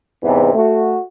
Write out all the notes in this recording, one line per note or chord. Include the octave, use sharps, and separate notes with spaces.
E2 G#2 C3 E3
A3 F#4